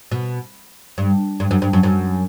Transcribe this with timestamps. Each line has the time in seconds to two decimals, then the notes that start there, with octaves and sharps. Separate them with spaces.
0.12 B2
0.98 G2
1.40 G2
1.51 F#2
1.62 G2
1.73 F#2
1.83 F#2